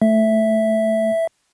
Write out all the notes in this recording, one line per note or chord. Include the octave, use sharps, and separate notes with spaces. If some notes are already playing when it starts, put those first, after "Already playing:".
A3 E5